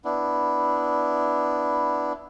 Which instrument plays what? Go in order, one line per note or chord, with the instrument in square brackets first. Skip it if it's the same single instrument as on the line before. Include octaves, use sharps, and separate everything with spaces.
[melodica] B3 D4 E4